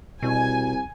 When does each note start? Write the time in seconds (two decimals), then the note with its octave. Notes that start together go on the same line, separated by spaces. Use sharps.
0.22 C2 B2 G#5